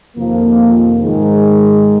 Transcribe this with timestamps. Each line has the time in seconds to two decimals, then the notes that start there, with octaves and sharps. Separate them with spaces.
0.17 F2 C3 D#3 F3 A#3
1.03 G#2 D#3 G#3